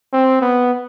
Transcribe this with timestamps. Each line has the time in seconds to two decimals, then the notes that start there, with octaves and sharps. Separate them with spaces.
0.13 C4
0.42 B3